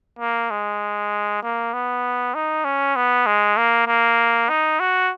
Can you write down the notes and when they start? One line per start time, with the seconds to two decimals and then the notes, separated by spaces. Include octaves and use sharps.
0.19 A#3
0.51 G#3
1.43 A#3
1.74 B3
2.35 D#4
2.65 C#4
2.96 B3
3.27 G#3
3.57 A#3
3.87 A#3
4.49 D#4
4.80 F#4